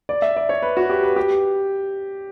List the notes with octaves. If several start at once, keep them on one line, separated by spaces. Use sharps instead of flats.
D5
E5
D5
C#5
B4
F#4
G4
B4
G4